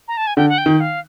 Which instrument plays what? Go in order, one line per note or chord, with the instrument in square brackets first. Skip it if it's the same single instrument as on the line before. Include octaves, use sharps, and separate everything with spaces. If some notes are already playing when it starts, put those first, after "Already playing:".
[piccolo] A#5
A5
G#5
[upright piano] D3 [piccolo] G5
[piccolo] F#5
G5
[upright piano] D#3
[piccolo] F5